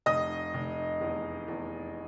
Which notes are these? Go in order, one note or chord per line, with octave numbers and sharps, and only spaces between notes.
F1 D#5 D#6
F1
E2
E2